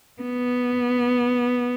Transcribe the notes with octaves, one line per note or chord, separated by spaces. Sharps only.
B3